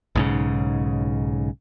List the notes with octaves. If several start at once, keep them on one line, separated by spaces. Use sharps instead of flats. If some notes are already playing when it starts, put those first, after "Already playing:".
B1 G#2 C#3